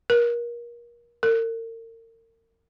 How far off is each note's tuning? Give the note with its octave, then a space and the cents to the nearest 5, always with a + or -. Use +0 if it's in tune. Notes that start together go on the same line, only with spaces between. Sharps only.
A#4 +30
A#4 -40